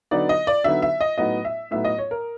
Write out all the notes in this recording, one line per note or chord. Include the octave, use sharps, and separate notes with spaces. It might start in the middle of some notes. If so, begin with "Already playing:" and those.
D3 F#3 B3 D#4 D5
D#5
D5
D3 F#3 B3 D#4 E5
E5
D#5
A2 F#3 B3 D#4 D#5
E5
A2 F#3 B3 D#4 E5
D#5
C#5
A#4